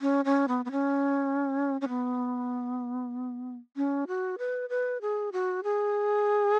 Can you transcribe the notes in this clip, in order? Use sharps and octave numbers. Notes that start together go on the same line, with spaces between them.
C#4
C#4
B3
B3
C#4
C#4
B3
C#4
F#4
B4
B4
G#4
F#4
G#4